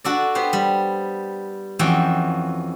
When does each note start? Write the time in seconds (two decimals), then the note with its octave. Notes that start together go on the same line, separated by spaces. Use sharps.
0.04 D4 F#4 A4 D5
0.35 B3 G4 C5
0.53 G3
1.79 F2 E3 C#4 F#4 G5